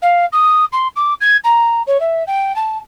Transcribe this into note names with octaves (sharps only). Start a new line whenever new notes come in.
F5
D#6
C6
D6
G#6
A#5
C#5
E5
G5
A5